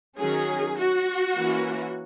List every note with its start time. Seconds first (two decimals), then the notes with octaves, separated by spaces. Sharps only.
0.18 D#3 F#3 C#4 G#4
0.78 F#4
1.36 E3 A#3 C#4